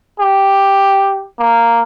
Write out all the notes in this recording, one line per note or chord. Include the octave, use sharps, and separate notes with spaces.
G4
A#3